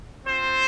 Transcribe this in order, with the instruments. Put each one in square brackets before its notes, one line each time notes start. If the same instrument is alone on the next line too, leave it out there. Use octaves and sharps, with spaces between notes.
[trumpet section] C4 F4 C5